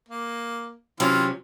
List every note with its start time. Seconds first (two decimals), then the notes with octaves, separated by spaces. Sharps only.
0.09 A#3
1.00 C3 E3 F#3 C4 C#4 F4